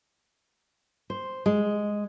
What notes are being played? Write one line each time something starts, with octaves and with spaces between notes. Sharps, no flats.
C5
G#3